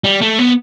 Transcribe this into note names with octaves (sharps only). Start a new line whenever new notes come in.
G3
A3
B3